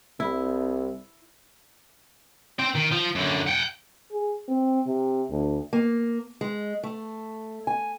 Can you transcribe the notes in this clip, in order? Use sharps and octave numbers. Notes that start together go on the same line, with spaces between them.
C2 E4
C4 G5
D#3
F3
F#2 D3
F#5 G5
G#4
C4
C3
D2
A#3
G#3
A3
G#5